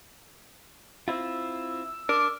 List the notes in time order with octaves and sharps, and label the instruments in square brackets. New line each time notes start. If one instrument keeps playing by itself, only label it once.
[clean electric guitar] C4 E4 F4 [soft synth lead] E6
[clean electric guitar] D4 [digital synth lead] A#4 [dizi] D6